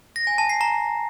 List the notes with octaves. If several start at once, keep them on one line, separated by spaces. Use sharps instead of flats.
A#6
G#5
A5
C7
A#5